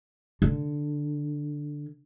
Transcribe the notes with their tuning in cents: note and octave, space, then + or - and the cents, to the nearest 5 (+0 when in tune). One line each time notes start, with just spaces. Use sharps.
D3 +5